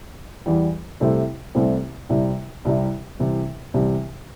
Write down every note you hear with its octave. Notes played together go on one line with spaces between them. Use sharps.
E2 E3 G3
C2 C3 A3 C4 E4
C2 C3 A3 C4 E4
C2 C3 G3 E4
C2 C3 G3 E4
C2 C3 E3
C2 C3 E3